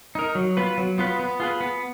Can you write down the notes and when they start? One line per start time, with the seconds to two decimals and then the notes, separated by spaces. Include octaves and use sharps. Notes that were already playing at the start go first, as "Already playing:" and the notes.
0.15 D#4 A#4
0.35 F#3
0.57 B3 F4 B4
0.78 F#3
0.98 B3 F4 B4
1.19 B3
1.40 F4 G#4 B4
1.61 B3